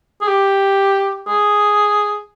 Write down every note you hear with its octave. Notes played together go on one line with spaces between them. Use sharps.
G#4
G4
G#4